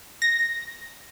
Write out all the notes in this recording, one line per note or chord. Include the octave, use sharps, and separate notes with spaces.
A#6